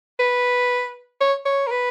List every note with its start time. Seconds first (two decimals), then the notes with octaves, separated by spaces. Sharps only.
0.20 B4
1.21 C#5
1.46 C#5
1.67 A#4
1.71 B4